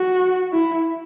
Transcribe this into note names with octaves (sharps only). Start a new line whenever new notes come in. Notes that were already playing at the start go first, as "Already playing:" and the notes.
Already playing: F#4
E4